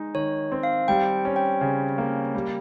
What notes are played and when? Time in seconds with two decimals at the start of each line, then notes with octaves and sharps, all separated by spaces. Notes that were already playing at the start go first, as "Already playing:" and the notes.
Already playing: G#3 D#4
0.15 D#3 C#5
0.52 C4
0.63 F5
0.88 G3 G5
1.25 C#4
1.36 G5
1.61 C#3
1.98 A#3
2.35 G3